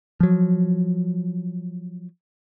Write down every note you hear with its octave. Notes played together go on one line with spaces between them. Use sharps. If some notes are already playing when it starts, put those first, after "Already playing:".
F3 F#3